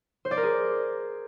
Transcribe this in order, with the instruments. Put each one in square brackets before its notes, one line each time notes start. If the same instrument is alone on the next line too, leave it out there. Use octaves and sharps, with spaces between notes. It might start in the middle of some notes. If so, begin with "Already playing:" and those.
[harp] C5
D5
A#4
G#4